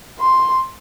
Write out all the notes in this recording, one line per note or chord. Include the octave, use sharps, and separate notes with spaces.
C6